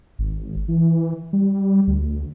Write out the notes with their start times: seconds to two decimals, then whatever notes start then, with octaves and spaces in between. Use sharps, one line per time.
0.19 G#1
0.68 E3
1.33 G3
1.87 D2